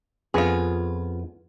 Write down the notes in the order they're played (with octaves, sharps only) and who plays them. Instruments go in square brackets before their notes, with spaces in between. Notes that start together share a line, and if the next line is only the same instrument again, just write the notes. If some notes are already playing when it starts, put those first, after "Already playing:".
[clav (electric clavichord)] F2 B3 [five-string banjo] F4 G#4